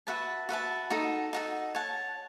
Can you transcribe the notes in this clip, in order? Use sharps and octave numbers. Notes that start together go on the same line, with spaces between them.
F#4 B4 E5 A5
F#4 B4 E5 A5
D#4 F#4 A4
D#4 F#4 A4
C#5 F#5 A5